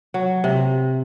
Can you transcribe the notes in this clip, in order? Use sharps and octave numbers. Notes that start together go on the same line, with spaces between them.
F#3
C3